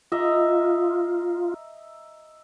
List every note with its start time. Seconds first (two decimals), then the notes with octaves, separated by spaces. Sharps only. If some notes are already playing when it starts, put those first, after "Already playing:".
0.12 F4 D#5 E5 A#5